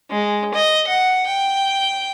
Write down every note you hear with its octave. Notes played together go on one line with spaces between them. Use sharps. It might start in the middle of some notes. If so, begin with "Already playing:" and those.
G#3
D#5
F#5
G5